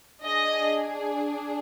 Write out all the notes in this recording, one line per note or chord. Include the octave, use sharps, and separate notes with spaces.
D4 G#4 D#5